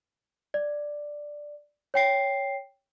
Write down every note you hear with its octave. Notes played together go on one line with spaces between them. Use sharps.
D5
C#5 G5 C7